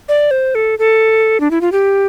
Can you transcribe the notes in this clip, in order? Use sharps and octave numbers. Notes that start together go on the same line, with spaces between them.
D5
C5
A4
A4
D4
E4
F4
G4